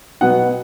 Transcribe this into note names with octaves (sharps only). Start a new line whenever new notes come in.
B2 F#3 B3 F#5